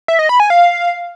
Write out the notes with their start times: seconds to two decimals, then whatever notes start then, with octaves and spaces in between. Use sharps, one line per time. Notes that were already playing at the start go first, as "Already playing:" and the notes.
0.08 E5
0.19 D#5
0.29 B5
0.40 G#5
0.50 F5